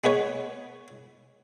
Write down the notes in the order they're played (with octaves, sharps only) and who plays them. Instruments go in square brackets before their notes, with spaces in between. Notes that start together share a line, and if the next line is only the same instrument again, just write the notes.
[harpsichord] G#3 B3 B4 C#5